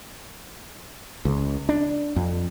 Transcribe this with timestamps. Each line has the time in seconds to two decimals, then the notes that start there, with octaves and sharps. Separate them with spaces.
1.25 C#2
1.69 D4
2.16 F2